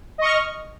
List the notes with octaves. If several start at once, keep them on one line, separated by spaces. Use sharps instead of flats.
D#5 C#6 F6